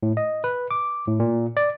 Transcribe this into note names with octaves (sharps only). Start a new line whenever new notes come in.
A2
D#5
B4
D6
A2
A#2
D5